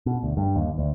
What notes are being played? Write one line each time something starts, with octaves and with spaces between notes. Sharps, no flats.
B2
D2
G2
D#2
D2